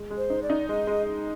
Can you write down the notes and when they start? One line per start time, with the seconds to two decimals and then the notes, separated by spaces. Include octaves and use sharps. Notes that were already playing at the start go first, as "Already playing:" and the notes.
Already playing: G#3
0.10 G#3
0.17 C5
0.30 D#4
0.43 D5
0.50 D#4
0.69 G#3 D#5
0.87 G#3